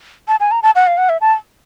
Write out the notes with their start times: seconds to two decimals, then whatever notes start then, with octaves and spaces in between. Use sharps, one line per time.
0.28 A5
0.40 G#5
0.51 A#5
0.63 A5
0.75 F#5
0.87 F5
0.98 F#5
1.09 E5
1.21 A5